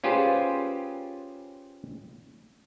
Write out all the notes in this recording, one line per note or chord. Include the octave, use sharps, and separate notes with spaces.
C#4 F4 G4 G#4 B4 C5